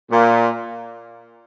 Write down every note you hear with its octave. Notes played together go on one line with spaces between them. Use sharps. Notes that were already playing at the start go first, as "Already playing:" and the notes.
A#2